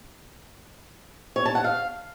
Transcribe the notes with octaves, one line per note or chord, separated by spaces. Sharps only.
C#5
A5
F#5
F5